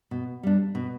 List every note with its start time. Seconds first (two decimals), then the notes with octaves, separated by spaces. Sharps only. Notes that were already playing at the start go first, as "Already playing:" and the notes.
0.11 B2
0.43 G3 D4
0.75 B2